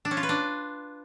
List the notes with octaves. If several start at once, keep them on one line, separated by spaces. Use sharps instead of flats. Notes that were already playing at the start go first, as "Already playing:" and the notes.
D4
C#4
F4
B4
D4